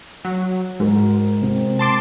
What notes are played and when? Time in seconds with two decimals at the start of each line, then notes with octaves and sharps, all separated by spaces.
0.25 F#3
0.80 G#2 G#3 F#4 A#4
1.42 C3 C4 C5
1.79 A5 C6 D6